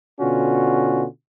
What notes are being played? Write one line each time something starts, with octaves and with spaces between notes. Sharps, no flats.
B2 D3 C#4 F4 F#4